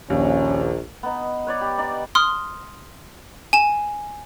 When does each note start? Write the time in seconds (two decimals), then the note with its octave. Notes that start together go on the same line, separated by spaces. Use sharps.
0.10 A#1 D#2 C#4
1.03 B3 D#4
1.47 B4 C#5 D5
1.61 G4
1.78 D#4 D5
2.15 C6 D#6 F6
3.53 G#5 E7